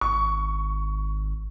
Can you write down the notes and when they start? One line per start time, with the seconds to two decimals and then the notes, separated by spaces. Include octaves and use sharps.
0.01 G#1 C#6